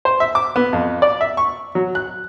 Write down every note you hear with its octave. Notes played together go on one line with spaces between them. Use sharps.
C5
E5
D6
B3
F2
D5
E5
C#6
F#3
F#6